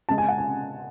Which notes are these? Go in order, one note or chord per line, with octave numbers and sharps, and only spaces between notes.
C#3 G#3 A5
G#5
F#5
G#5